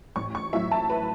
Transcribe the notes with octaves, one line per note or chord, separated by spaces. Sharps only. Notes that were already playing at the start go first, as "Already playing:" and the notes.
A1 C#6
C#6
A2 F#3 E5
A5
B4